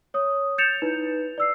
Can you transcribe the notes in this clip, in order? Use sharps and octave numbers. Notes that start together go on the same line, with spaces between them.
C#5 D#6
G6 A6 C#7 E7 F7
D#4 E4 B4
D5 E6 C7